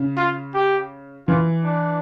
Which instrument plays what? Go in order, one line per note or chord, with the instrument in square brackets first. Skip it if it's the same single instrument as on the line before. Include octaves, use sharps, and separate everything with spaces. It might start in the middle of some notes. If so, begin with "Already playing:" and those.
Already playing: [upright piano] C#3
[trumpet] F4
G4
[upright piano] E3 [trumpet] F4
[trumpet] D4